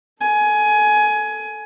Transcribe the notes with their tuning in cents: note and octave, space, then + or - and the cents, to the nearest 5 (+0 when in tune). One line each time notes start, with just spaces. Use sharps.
A4 +0 G#5 +20